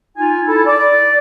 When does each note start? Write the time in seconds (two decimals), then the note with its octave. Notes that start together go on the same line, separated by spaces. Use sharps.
0.17 D#4 F4 G#5
0.47 E4 A4
0.66 D5